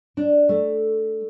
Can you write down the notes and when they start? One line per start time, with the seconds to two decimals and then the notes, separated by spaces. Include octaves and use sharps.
0.17 D4
0.49 A3